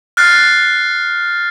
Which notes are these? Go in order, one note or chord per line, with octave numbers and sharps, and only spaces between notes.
F6 F#6 A6 C7